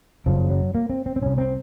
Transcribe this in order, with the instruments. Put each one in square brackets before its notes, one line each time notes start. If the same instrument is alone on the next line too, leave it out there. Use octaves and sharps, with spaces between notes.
[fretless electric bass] F#1 F#2 C#3 F3
F#3
A#3
C4
C4
C4
C2 C3 C#4
C4